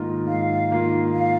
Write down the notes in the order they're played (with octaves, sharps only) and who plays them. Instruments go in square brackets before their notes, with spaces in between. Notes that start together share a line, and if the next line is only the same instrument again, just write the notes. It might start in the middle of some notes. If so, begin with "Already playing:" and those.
Already playing: [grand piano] G#2 D#3 A#3 F4
[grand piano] G#2 [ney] F5
[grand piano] D#3 A#3 F4
[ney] F5